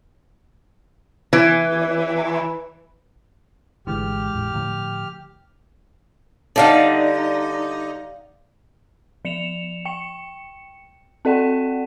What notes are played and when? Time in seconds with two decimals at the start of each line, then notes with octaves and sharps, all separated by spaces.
1.33 E3
3.87 G#1 D3 E3 G#3 A3 G4 F6
4.35 E2 A2
4.54 A2 D3 F3 A3
6.56 D3 G3 D#4 D5 F5 F#5
9.25 F3 C#7 E7 F7
9.85 G5 C#7
11.25 C4 A4 D5 F#5 G5